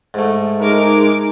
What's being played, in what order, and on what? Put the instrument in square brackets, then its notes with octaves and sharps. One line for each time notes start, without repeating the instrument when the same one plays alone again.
[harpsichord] G#2 A3
[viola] G#3 D6 [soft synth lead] D#4 [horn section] A#4